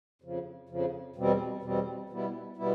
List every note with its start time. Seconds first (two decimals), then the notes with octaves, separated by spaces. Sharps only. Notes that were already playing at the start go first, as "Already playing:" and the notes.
0.22 F2 C#3 F3
0.69 F2 C#3 F3
1.16 E2 B2 G3 C4
1.62 E2 B2 G3 C4
2.09 B2 G3 B3 E4
2.57 B2 G3 B3 E4